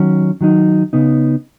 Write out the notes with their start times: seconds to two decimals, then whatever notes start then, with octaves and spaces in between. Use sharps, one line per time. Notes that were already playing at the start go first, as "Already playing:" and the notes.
Already playing: D#3 F#3 C#4
0.41 D#3 F#3 D#4
0.93 C#3 B3 D#4